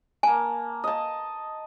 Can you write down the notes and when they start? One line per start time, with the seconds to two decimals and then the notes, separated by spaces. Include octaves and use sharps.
0.23 A#3 G#5 A5
0.84 D#5 A5